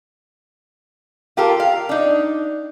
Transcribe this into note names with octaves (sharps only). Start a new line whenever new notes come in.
F4 G4 A4 A#4
F5
D4 D#4